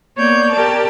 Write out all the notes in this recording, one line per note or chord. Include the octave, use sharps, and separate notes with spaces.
A#3 B3 C#5 D5 G6
G4 A#4 D5 A5